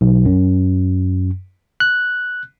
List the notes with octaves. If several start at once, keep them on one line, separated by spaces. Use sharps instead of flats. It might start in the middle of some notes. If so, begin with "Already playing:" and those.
B1
F#2
F#6